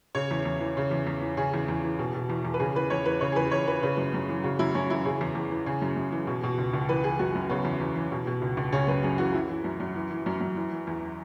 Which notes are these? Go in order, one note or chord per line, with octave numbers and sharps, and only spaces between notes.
C#3 C#5
E2
E2
E3
C#3
E2
E2
E3
C#3 G#4
E2
E2
E3
B2
B2
E2
E2
B4
C#3 G#4
E2 B4
E2 C#5
E3 B4
C#3 C#5
G#4
E2 B4
E2 C#5
E3 B4
C#3 B4
F#2
F#2
E3
C#3 F#4
F#2 E4
F#2 C#4
E3 E4
C#3 G#4
E2
E2
E3
C#3 G#4
F#2
F#2
E3
B2
B2
C#2
C#2
E3 B4
E3 G#4
F#2 F#4
F#2
C#3 B3
E2
E2
E3
B2
B2
C#2
C#2
C#3 C#4
F#2 B4
F#2 G#4
E3 F#4
E3 E4
E3
F#2
F#2
E3
E3
F#2
F#2
E3
E3
E2